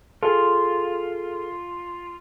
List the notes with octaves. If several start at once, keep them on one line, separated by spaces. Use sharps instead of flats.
F4 G#4 A4